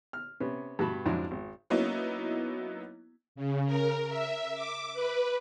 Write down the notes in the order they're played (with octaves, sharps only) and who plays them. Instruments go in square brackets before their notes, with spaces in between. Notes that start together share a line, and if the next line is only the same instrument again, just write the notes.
[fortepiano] F6
C3 B3 C#4
G2 B2 F#4 A5 B5
F2 G#2 F#3 D4 E4
G#1
[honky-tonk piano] F#3 A#3 B3 C#4 D#4 E4
[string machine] C#3
A#4
E5
D6
B4